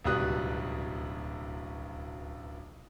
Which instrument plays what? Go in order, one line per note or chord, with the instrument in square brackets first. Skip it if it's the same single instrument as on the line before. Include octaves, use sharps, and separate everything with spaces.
[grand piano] D1 C#2 B2 G3 D#6 F#6